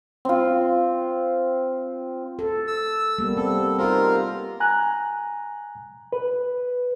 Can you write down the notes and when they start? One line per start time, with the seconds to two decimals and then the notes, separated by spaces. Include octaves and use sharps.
0.25 C4 F4
2.39 A4
2.68 E6
3.18 G3 A#3 B3
3.37 C4 A4
3.79 D#4 F4 G4 A#4 C5
4.60 G#5 A#5 F#6
6.13 B4